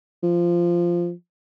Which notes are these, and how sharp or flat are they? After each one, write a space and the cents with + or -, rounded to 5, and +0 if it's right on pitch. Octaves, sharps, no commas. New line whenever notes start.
F3 -10